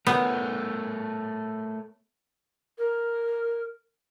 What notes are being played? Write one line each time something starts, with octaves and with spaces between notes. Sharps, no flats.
A3 B3 A#4 C#5
A#4